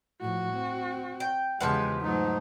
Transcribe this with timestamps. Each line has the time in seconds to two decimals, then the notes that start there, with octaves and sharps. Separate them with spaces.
0.21 A2 F3 F#4
0.53 C4
1.20 G5
1.61 E2 C#3 F3 G#3 G4 B4 F#5
2.03 G#2 F#3 A3 D#4 A5